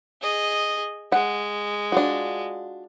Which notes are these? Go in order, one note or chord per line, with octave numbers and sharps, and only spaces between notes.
G#4 D#5
G#3 F#5
D4 F4 F#4